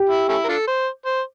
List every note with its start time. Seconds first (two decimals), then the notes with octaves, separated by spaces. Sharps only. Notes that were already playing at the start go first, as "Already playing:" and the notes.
Already playing: G4
0.10 E4
0.29 A3 C#4 E4
0.44 A#4
0.49 D4 F4 A4
0.67 C5
1.06 C5